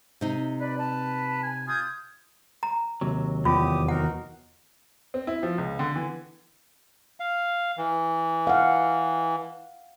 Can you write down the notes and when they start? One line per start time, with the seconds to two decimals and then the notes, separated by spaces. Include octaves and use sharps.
0.21 C3 D#4
0.60 B4 D5
0.77 A5
1.43 G#5
1.68 F4 D#6 G6 G#6
2.63 A#5
3.01 D#2 C3 F#3
3.45 E2 F4 G4 D#6
3.88 D#4 F#4 A#4 F#5
5.14 C4
5.27 E4
5.43 F3
5.58 C#2
5.79 D3
5.96 E3
7.20 F5
7.78 E3
8.47 F5 F#5